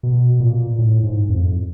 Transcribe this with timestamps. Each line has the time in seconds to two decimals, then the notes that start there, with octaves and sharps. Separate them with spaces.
0.03 B2
0.40 A#2
0.78 A2
1.03 G#2
1.29 F2